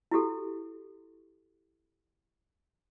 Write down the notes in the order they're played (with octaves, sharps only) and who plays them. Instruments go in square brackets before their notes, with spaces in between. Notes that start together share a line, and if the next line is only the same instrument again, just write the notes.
[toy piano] E4 F#4 G4 A4